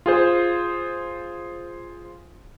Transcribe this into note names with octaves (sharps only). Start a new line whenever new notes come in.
F4 G#4 C5